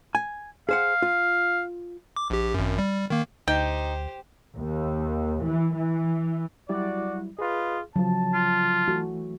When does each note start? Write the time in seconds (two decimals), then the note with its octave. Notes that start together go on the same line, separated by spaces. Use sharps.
0.15 G#5
0.69 G#4 C5 F5 F#5
1.02 F4
2.16 D6
2.30 A#1 G4
2.54 G#1 F#2
2.79 G3
3.10 D#3 A#3
3.48 D2 D#4 G4 C5 G5
4.57 D#2
5.42 E3
5.74 E3
6.69 F#3 G3 E4 F#4 D5
7.39 F4 G#4 B4 D#5
7.96 C#3 F3 F#3 A5
8.34 F4
8.88 E3 F#3 A3 F#4